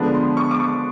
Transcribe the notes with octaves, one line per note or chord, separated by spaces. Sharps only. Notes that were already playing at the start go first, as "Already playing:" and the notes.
Already playing: D3 F3 G#3 B3 D4 B5
C6
C#6
D6
C#6